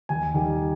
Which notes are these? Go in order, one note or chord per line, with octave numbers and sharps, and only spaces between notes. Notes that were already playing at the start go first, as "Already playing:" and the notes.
D#2 G#5
D#3 G3